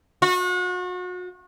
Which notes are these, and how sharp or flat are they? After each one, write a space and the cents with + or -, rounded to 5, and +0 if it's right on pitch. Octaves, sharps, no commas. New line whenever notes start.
F#4 -35